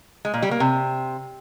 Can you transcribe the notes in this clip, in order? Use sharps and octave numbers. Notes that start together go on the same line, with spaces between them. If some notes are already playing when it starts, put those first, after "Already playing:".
G#3
A#2
G3
A#3
C3